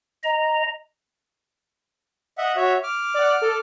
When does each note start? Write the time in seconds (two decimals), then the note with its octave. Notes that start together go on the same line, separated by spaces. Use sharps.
0.24 D#5 A#5
2.38 D#5 E5 F#5
2.56 F#4 C#5 E5
2.83 D6 F6
3.14 D5 F#5
3.42 A4